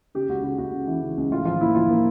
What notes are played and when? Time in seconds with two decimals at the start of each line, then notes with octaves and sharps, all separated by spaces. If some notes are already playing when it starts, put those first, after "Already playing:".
0.15 C#3 G4
0.29 C#2 F#4
0.44 C#3 F#4
0.58 C#2 F#4
0.73 C#3
0.87 E3
1.02 C#3
1.17 C#2
1.31 A2 F4
1.45 F3 F4
1.61 A#3 E4
1.75 F3 F4
1.89 A#3